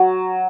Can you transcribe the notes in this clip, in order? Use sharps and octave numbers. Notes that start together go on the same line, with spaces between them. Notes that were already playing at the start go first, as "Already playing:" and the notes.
Already playing: F#3